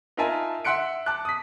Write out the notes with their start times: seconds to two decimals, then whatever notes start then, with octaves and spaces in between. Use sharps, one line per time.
0.17 D#4 F4 A#4 E5 G#5 A5
0.65 E5 F#5 C6 F#6 C#7 D7
1.06 A5 D6 F#6
1.25 D#6 B6